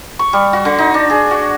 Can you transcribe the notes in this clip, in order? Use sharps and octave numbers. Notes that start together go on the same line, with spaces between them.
C#6
G3
F#4
D3
D#4
D4
G#4
F#4